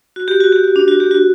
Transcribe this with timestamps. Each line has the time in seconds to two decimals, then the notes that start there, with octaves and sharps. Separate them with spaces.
0.16 F#4
0.28 G4
0.40 F#4
0.52 G4
0.64 F#4
0.76 D4
0.88 F#4
1.00 G4
1.11 F#4